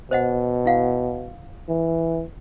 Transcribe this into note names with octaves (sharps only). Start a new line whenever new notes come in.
B2 C5 D#5 F#5
E4 F5 F#5
E3